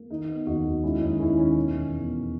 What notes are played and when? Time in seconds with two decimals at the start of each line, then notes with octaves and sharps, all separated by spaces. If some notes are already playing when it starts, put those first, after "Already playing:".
Already playing: A#3
0.10 D#3 D#4
0.28 B3
0.46 D#2 D#4 F#4
0.65 D#2
0.83 G#3 C#4 E4
1.01 D#2 D#4
1.19 D#2 C#4 E4
1.37 D#3 C#4
1.56 B2
1.74 E2
1.93 E2
2.11 B2